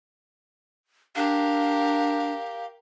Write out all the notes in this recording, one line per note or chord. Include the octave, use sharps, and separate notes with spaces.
D4 G4 A#4 F5